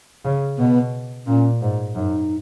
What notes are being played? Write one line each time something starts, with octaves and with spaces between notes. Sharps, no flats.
C#3
B2 B3
A#2 C#4
G#2
F#2 D#4